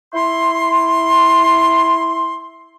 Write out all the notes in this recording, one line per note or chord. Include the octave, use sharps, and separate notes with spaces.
E4 C6